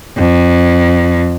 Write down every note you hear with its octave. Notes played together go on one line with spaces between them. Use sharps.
F2